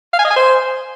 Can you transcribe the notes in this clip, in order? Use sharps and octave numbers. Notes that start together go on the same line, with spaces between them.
F5
G#5
D#5
G#5
C5